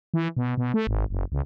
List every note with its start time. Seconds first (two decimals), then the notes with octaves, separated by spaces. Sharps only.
0.14 E3
0.37 B2
0.57 B2
0.74 A3
0.87 G#1
1.10 F#1
1.32 C#2